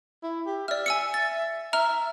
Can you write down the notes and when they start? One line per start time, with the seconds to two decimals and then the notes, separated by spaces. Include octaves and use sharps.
0.23 E4
0.46 G4
0.68 D5 E5 F6
0.86 G#5 E6 C#7
1.14 A6
1.73 E5 A#5 F6